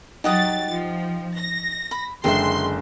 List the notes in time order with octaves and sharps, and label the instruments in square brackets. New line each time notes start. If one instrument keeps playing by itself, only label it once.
[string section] F#3 A6 [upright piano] D#4 [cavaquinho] G4 F#5 D#6
[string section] F3
A#6
[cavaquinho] B5
[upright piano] F#1 D3 G#3 [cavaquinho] E5 G5 [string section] C6